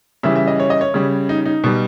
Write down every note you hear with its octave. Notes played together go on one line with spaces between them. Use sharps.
C#3 E3 G3 E5
E5
D#5
C#5
D#5
C#5
C#3 G3
D#4
D#4
B2 G3